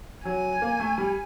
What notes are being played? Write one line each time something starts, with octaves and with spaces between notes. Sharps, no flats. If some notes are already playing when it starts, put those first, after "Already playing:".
F#3 G#5
A#3
A3
G3